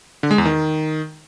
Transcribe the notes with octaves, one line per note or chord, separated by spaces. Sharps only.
D3
G#3
E2
D#3